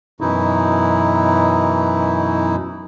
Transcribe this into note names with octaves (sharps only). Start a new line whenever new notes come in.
F#2 B2 E3 D#4 E4